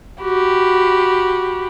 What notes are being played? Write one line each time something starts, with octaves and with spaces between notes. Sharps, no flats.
F#4 G4 B5